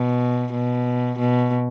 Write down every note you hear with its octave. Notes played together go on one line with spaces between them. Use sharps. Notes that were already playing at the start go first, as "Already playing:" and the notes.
Already playing: B2
B2
B2